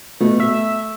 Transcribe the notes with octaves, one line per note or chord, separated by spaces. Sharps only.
B2 A3
E5